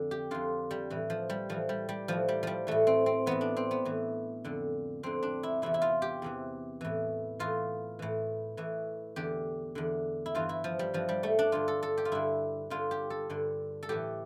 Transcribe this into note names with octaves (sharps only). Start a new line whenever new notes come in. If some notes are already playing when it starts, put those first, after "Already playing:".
Already playing: F2 D3
G4
F2 D3 F4
G3
A2 E3
F3
G3
A2 E3 F3
G3
G3
A2 E3 F3
G3
F3 G3
A2 E3 A3
C4
C4
A2 E3 B3
D4
C4
B3
A2 E3
F2 D3
F2 D3 C4
D4
E4
E2 C3 E3 E4
E4
F4
G4
E2 C3 E3
A2 E3
A2 E3 F4
A2 E3
A2 E3
E2 D3 G4
E2 D3
E4
G2 E3 F4
E4
F3
G3
G2 E3 F3
G3
A3
D4
G2 D3 F4
A4
A4
G4
F4
G2 D3 E4
G2 D3 F4
G4
A4
G2 D3
A4
A2 E3 G4